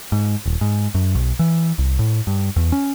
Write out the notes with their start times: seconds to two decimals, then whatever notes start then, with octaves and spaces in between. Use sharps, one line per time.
0.12 G#2
0.46 D#1
0.61 G#2
0.94 F#2
1.15 B1
1.39 E3
1.78 C2
1.99 A2
2.27 G2
2.56 E2
2.72 C#4